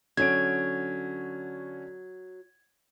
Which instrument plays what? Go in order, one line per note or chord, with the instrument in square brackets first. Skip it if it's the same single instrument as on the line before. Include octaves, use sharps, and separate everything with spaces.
[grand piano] D3 C#4 D7 [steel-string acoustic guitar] F#3 [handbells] G#6